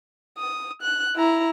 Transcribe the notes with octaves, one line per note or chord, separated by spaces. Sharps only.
D#6
F#6
E4 A#5